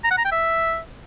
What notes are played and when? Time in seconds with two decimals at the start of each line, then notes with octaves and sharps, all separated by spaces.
0.04 A#5
0.11 F#5
0.18 A#5
0.25 G5
0.32 E5